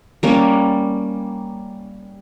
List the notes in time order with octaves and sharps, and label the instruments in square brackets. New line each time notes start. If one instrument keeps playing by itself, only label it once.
[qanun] G3 A#3 C#4